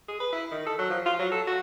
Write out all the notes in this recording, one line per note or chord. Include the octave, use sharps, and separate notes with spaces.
G#4
B4
E4
D#3
A4
F#3
F3
F4
F#3
A4
F#4